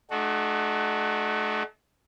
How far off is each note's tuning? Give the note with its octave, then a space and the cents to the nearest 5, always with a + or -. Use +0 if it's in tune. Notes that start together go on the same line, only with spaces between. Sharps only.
A3 -40 D4 +45 F#4 +0